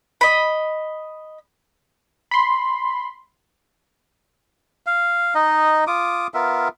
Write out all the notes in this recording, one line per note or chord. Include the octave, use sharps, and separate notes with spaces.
D#5 B5
B5 C6
F5
D#4 D#5
F4 D6 D#6
B3 F4 A#4 E5